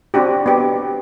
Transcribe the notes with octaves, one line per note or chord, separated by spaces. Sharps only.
C4 D4 F#4 G4
B3 G4